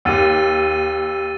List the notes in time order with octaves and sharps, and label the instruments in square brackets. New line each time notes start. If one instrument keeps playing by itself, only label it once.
[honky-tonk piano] D#2 [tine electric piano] G4 F#5 [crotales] E6 A6 D#7